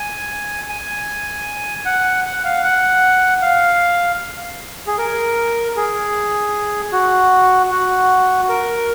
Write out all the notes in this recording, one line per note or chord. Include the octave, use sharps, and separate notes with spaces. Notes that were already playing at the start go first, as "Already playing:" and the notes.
Already playing: G#5
G#5
F#5
F#5
F5
F#5
F5
G#4
A#4
G#4
F#4
F#4
A#4